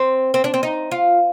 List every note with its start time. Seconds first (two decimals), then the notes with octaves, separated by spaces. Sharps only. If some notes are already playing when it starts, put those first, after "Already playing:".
Already playing: C4
0.34 C4
0.44 D4
0.54 C4
0.63 D#4
0.91 F4